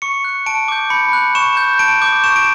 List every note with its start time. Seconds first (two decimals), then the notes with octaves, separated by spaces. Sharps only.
0.02 C#6 C#7
0.24 F#6
0.46 A5 D7
0.68 D6 G6
0.90 B5 C#7
1.13 F#6
1.35 C#6 E7
1.57 G6
1.79 A5 D7
2.02 D6 G6
2.24 C#6 E7
2.36 D7